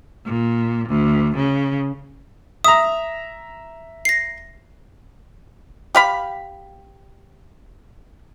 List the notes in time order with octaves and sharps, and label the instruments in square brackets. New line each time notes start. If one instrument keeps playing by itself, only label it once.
[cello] A#2
D2
C#3
[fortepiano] E5 A#5 [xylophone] D#6
[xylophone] A#6 C7
[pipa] G4 F5 B5